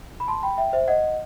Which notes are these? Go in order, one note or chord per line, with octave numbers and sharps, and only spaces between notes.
B5
A5 C6
G5 B5
E5 G5
C5 E5
D#5 F#5